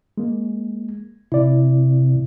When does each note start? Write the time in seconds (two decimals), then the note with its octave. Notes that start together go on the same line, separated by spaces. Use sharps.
0.18 G#3 A#3
1.32 C3 E4 D5